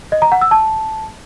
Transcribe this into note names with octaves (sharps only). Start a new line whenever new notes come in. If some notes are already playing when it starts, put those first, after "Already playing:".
D#5
A#5
F#5
E6
A5